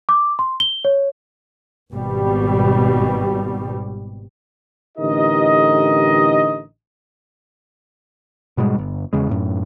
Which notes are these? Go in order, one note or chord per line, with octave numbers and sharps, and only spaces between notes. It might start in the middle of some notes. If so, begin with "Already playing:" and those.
D6
C6
G7
C#5
G#1 B2 G3
A1 D3 D#4 G4 A#4 D#5
G#2 B2 G3 G#3
G1
E2 C#3 G#3
F#2 A2